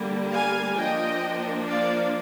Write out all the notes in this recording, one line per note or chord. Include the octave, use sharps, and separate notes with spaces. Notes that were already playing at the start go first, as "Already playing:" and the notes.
Already playing: D3 G3 A#3
F5 G#5
F3 A#3 D4 D#5 G5
D5 F5